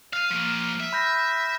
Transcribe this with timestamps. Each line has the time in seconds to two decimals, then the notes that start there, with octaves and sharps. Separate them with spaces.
0.13 F5 F6 D#7
0.31 F3 A#3
0.80 E5
0.93 B5 G6 A#6